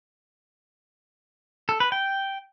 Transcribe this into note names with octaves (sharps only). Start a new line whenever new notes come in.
A4
B4
G5